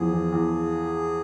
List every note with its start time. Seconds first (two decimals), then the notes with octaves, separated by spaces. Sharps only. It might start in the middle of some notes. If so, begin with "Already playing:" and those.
Already playing: E2 F3 G#4
0.12 E2
0.32 E2